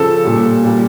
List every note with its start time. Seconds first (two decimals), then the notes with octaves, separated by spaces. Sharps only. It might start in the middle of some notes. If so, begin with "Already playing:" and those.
Already playing: C#3 F3 A4 A5
0.25 A#2 G3
0.63 A#2 G3